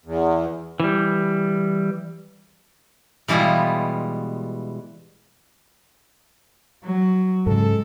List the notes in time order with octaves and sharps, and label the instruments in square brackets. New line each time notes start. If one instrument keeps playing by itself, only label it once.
[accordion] E2
[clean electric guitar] E3 G3
[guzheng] B2 E3 G3 G#3 E4 F4
[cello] F#3
[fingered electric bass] G#2 C#3 [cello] G#3 [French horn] A4